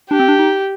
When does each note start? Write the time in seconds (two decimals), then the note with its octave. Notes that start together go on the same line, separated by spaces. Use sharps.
0.10 D4 G4
0.20 C4
0.28 D4
0.39 D#4